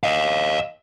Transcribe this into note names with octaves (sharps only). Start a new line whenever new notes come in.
D#5 F5